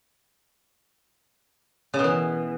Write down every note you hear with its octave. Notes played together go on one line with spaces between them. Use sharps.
C#3
B2
E3